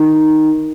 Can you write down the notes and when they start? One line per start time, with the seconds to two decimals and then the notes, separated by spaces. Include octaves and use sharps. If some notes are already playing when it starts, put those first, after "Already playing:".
Already playing: D#3